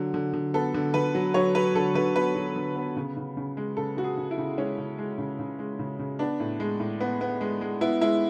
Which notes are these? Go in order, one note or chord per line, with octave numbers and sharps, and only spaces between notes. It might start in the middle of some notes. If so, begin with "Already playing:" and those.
Already playing: D3 F#3
D3
D3
B3 A4
D3
D3 B4
F#3
F#3 C#5
F#3 B4
D3 A4
D3 B4
B3 B4
F#3
D3
B3
C#3
C#3
C#3
G#3
C#3 A4
C#3 F#4
G#4
C#3
E4
C#3
G#3 C#4
C#3
G#3
C#3
C#3
G#3
C#3
C#3
B3 D4
A2
G#3
A2
B3
B3
G#3
G#3
B3 E4
G#3 E4